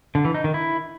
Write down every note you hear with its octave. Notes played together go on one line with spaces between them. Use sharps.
D3
E3
D#4
D#3
E4